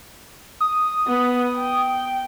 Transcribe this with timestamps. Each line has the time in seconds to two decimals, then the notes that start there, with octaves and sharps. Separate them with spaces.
0.61 D#6
1.08 B3
1.57 G5